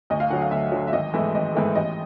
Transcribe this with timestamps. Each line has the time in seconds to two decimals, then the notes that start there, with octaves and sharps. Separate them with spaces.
0.10 D2 D#5
0.20 F5
0.30 D3 F#3 F#5
0.42 F5
0.51 D2 E5
0.72 D3 F#3
0.87 E5
0.93 G#1 D#5
1.14 G#2 E3 A3 E5
1.34 G#1 D#5
1.55 G#2 E3 A3
1.75 A1 D#5